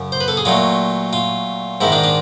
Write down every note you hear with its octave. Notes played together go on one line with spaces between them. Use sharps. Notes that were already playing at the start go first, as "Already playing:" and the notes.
Already playing: F#2 C#3
C5
B4
A4
G#4
A#2 F#3 A3 F4
F4
G#2 D#3 G#3 E4
D4
D4